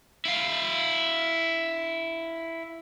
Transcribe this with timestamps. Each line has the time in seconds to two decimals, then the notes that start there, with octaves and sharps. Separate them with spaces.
0.25 E4 F5